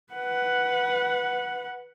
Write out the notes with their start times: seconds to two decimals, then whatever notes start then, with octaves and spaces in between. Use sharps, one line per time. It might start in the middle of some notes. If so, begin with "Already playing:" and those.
0.13 B4 F#5